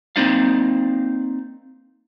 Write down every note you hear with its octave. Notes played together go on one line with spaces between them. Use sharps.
A#3 C4 D#4 D5 F5